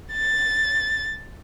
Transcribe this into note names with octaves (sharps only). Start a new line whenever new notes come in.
A6